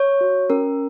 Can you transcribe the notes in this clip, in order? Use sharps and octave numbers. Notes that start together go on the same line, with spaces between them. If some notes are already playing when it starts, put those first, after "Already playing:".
Already playing: C#5
F#4
C#4 A#4